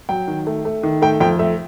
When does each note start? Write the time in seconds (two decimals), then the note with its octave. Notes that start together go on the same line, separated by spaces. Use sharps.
0.09 F#3 G5
0.28 D#3
0.47 A3
0.65 A3
0.83 D#3
1.02 A3 G5
1.20 F2 G5
1.39 A3 E5